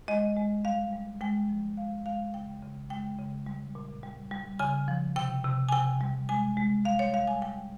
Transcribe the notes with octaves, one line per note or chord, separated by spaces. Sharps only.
G#3 D#5
G#3
G3 F5
G3
G#3 G5
F3
G#3 F5
G#3 F5
C#3 G5
C#3
G#3 G5
C#3
G3
A#2
G3
G3
C#3 G#5
F3
C3 G5
C3
G#5
C3 G5
G3
G#3 G#5
G#3
G3 F5
C#5
G3 F5
G#5
G3 G5